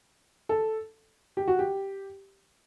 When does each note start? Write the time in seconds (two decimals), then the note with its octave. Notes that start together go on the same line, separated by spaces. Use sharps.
0.49 A4
1.37 G4
1.48 F#4
1.59 G4